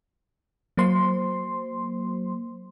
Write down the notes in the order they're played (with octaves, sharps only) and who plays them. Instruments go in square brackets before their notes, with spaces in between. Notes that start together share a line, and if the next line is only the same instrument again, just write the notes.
[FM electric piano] F#3 A#3 C5 C6